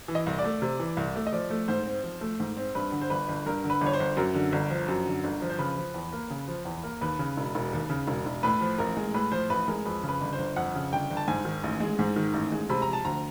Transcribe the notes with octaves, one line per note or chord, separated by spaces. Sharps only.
E3
D#5
C2
D5
A3
C3
E3
C2
A3
D#5
F3 D5
A3
G#2 C5
C4
F3
A3
G#2
C4
G2 B4
D3
C5
G1 B4
G1
G2 A#4
D3
B4
G1
C#5
C5
G1
F#2 A#4
D3
G1
F3
F#2
D3
G1
F3
C5
C#3 B4
F3
E2
A#3
C#3
F3
E2
A#3
D#2 B4
C#3
E1
E1
D#2
C#3
E1
E1
A2 B4
F3
A1 A#4
G#3
A2 B4
F3 C5
A1 B4
G#3 A#4
F2 B4
C#3
B4
G1
C5
G1
F2 F#5
C#3
G1 G5
G1
A5
G#2 G#5
D#3
A1
G#3
G#2
D#3
A1
G#3
C3 B5
A#5
F3
A5
D2 A#5